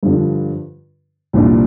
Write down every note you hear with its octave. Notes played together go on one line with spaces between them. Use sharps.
G2 D3 F3 D4
C2 A#2 F3 D4